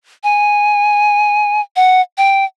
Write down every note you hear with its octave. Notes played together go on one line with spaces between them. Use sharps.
G#5
F#5
G5